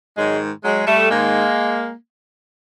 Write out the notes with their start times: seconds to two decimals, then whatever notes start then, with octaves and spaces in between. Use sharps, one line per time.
0.18 G#2 D#3 F#3 G#3
0.63 F#3 G#3
0.86 G3 A3
1.09 G#2 D#3 G#3 A#3